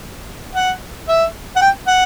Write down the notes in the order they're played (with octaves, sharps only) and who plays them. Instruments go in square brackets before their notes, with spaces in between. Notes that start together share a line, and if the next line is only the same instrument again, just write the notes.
[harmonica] F#5
E5
F#5
G5
F#5